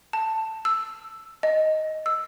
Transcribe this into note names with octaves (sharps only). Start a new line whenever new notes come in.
A5
E6
D#5
E6